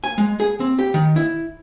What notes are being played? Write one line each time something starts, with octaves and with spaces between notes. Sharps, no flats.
G#5
G#3
G#4
C4
G4
D#3
E4